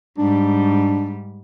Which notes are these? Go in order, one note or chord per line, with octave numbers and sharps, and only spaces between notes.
G#2 G3 D4